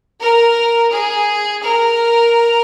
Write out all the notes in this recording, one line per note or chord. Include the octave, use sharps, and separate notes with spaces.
A#4
G#4
A#4